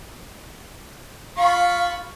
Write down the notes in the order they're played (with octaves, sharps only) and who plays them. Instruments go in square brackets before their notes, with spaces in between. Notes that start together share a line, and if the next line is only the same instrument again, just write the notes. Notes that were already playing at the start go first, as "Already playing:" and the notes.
[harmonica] F4 B5 C#6 [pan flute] F5